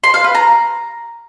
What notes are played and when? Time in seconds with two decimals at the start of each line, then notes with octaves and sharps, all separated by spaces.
0.04 C6
0.14 F5
0.24 B4
0.35 A#5